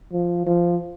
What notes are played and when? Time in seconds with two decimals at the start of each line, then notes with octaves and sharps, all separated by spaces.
0.12 F3
0.46 F3